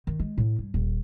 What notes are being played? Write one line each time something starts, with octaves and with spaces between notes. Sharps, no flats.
D#3
G#3
A2
G2
D#1